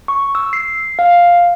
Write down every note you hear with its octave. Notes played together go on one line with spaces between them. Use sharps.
C#6
E6
C7
F5